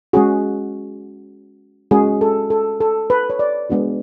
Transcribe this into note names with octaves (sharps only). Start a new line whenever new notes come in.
G#3 C#4 F#4 G#4
G#3 C#4 F#4 G#4
A4
A4
A4
B4
C#5
D5
G#3 B3 D4 F#4